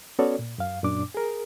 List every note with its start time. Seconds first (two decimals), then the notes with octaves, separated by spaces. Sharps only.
0.19 B3 C#4 F#4 A4 C#5 D5
0.39 A#2
0.58 F#2 F5
0.83 F#2 A#2 D4 D6
1.14 G#4 A#4